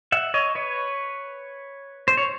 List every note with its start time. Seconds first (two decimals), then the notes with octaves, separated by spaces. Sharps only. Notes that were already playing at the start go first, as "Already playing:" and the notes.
0.12 E5 F#5
0.34 C#5 D#5
0.55 B4 C#5
2.08 C5
2.17 C#5